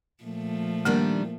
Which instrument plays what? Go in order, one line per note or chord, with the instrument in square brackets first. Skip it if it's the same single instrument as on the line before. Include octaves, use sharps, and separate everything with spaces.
[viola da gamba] A#2 F3 A3
[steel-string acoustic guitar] D#3 G3 D4 [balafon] A#3 A#4